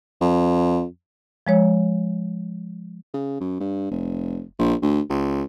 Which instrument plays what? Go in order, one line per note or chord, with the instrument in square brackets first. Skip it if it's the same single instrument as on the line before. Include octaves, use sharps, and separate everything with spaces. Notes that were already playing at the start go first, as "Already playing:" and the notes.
[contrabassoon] F2
[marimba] F3 G#3 C#5
[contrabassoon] C#3
F#2
G2
F1
A#1
D2
C#2